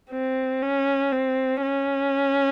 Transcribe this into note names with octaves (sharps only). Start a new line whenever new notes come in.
C4
C#4
C4
C#4